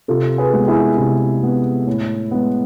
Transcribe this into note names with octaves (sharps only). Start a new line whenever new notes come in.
C3 F4 A4
G#4 B4
G#3 B3
E4 G#4
C3 E4
G#3 B3
A2
G#3 B3